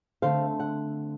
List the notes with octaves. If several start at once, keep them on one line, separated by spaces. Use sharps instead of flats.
D3 A3 C4 A4 C5 F5
F#5